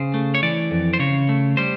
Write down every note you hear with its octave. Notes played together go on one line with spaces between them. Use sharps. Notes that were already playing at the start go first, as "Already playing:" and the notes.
Already playing: C#3 C5
A3
C#5
E3 D5
F2
C5
C#3 C#5
A3
G3 C5